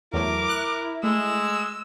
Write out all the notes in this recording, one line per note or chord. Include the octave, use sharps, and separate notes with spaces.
E2 F#3 A3 E4 A#4 D6
F#6
G#3 A3 E6